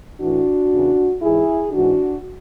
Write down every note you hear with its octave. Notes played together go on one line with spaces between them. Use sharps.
A2 E3 D4 F#4
E2 C#3 E3
G#2 E3 E4 G#4
G#2 E3 D4 F#4